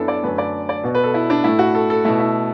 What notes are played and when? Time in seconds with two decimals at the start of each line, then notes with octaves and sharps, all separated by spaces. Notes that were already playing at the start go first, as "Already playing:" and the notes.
Already playing: F#2 B3 D4 E4 A4
0.08 D5
0.23 F#2 D3 A3 B4
0.38 D5
0.69 D5
0.83 B2 B3
0.95 B4
1.03 A4
1.14 E4
1.30 D4
1.44 A2 A3 E4
1.59 F#4
1.75 A4
1.90 A4
2.05 B2 A3 E4
2.19 E4